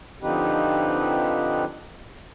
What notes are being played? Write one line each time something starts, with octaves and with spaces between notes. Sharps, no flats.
D3 F3 C4 D#4 G4 B4